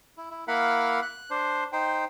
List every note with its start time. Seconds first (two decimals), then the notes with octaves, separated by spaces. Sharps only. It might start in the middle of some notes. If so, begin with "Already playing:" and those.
0.17 E4
0.31 E4
0.48 A#3 E4 A#4 F5 F#5 B5
1.02 F#6
1.30 D4 C5
1.73 D#4 C5 G5